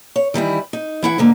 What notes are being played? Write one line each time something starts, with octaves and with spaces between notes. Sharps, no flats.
C#5
D#3 E3 G3 E4
D#4
E3 E4 F#5
G#2 D3 A#3